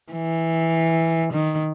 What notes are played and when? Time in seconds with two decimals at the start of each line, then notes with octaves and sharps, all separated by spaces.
0.13 E3
1.33 D#3